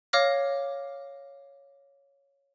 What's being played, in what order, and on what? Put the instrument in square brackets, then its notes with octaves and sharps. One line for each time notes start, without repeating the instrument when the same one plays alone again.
[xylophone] C#5 F5 D6 F6 A#6